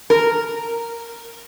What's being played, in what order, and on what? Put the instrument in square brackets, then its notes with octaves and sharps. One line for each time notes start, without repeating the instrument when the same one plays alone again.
[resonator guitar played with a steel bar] A#4